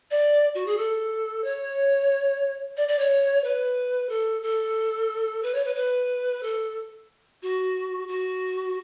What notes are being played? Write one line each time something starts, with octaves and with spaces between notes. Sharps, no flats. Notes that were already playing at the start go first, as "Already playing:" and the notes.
D5
F#4
G#4
A4
C#5
D5
D5
C#5
B4
A4
A4
B4
C#5
B4
B4
A4
F#4
F#4